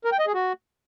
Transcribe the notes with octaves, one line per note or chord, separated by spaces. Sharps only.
A#4
G5
D#5
G#4
F#4